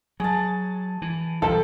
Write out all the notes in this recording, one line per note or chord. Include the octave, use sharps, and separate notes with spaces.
F#3 G#4 A5
E3
B1 E2 F3 G3 A4 C5 G5